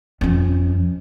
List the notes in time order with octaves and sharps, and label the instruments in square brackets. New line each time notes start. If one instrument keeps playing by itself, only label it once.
[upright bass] F2 C#4